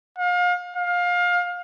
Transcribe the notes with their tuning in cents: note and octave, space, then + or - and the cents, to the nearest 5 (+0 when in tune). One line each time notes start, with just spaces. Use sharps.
F5 +35
F5 +25